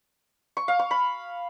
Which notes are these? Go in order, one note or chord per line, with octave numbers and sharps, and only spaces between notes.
C#6
F5
C#6
B5